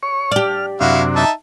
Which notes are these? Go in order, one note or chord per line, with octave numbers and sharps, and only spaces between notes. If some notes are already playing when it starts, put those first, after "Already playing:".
C#5 C#6
G4 D5 F6
F#2 C3 D4 E4 F#4 F5
D#4 E5 A5